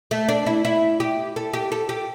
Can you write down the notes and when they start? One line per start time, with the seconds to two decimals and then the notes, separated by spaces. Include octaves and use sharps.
0.11 A3
0.29 D4
0.46 E4
0.65 E4
1.00 G4
1.36 A4
1.53 G4
1.72 A4
1.89 G4